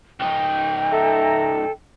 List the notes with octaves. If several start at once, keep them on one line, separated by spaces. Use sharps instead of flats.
C#2 D#4 G5
A4 E5 A#5